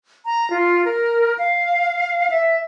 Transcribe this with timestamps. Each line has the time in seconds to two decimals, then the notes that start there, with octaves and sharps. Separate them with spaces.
0.24 A#5
0.50 F4
0.84 A#4
1.38 F5
2.30 E5